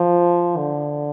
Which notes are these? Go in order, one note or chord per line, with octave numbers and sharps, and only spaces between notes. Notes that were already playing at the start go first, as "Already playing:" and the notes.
Already playing: F3
D3